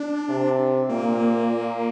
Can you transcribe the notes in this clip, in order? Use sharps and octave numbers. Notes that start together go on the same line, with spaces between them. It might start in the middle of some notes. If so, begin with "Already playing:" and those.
Already playing: D4
C3
A#2 A#3
A#2